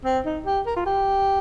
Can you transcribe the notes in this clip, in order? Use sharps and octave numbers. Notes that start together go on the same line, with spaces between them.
C4
D#4
G4
A#4
F4
G4